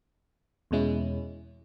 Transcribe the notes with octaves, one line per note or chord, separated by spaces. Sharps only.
E2 B2 G#3 C#4 E4